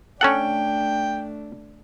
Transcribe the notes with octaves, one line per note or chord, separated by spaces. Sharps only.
A3 C#4 D4 A4 F#5 G5